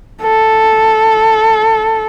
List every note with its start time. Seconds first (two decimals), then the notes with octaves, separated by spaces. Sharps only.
0.23 A4